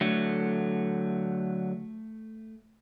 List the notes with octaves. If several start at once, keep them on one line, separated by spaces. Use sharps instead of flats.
D3 F#3 A3